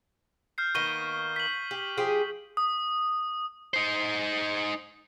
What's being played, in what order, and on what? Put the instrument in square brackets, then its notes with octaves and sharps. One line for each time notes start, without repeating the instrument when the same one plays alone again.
[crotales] F6 G6 C7
[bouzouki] D#3 A#3 B3 [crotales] C#6 D#7 G7
[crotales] B6 F#7
[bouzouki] G4
F3 G4 G#4
[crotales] D#6
[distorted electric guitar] D#4 C5